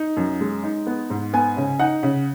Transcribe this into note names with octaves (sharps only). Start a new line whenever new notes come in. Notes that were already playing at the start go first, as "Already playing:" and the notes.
Already playing: D#4
F#2
G#3
D#4
B3
G#2
B3 G#5
C#3
D#4 F#5
C#3